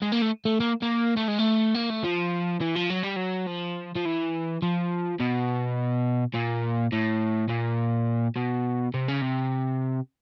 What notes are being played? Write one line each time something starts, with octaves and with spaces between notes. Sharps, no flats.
G#3
A#3
A3
A3
A#3
A#3
A3
G#3
A3
A#3
A3
F3
E3
F3
F#3
G3
F#3
F3
F3
E3
F3
B2
A#2
A2
A#2
B2
C3
C#3
C3